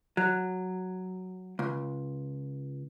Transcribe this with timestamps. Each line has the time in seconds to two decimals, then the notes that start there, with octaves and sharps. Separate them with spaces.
0.17 F#3
1.59 C#2